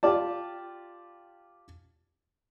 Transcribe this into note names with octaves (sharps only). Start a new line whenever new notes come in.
F4 G4 D5 A5